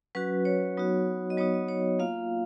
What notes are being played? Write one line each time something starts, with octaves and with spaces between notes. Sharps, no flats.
F#3 C#4 F#4 B4
C#5
F#3 B3 D#4 F#4
D#5
F#3 B3 D#4 F#4 C#5
D#5
C#5
A#3 F4 F5